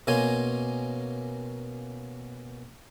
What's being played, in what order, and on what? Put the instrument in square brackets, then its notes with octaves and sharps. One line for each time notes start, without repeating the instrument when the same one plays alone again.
[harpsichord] B2 A#3 C#4 G#5 C6